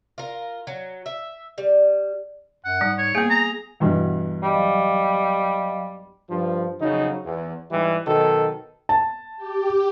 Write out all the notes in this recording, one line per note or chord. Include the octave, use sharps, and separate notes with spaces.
F4 A#4
F#3
E5
G3
F#2 F#5
G#2 G3
C#5
A#3 B3 G#4
A#5
E2 G2 B2
F#3 G3 D#5 F5
G2 F3
F2 C#3 F#3 D#4
E2
G#2 E3 G3
B2 D#3 F#3 A4
A5
G4